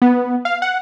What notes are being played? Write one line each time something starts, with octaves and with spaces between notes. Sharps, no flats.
B3
F5
F#5